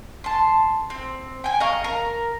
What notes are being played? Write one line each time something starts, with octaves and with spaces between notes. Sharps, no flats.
A5 C6
C4
G5 G#5
D#5 F5 A#5 C#6
A#4 A#5